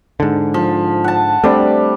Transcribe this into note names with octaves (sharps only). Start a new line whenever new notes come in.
G#2 D3
F3
F#5 A5
G3 A3 C4 D4